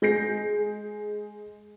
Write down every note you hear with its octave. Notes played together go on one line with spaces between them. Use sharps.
G#3 G6 A#6 C7